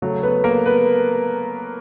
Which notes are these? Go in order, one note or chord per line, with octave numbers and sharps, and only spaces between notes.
C#3 F#3 A3
B3 B4
A#3 A#4
B3 B4